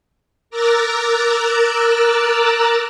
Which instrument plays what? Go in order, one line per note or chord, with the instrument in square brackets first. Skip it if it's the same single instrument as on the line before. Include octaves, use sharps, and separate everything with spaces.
[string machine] A#4 A#5 D6 E6 F#6 A6